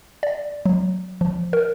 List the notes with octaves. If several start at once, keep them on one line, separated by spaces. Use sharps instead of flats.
D5
F#3
F3
A#4